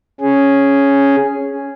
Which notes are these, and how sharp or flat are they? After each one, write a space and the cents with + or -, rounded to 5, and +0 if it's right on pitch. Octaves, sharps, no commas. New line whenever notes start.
C#4 +0 G#4 +0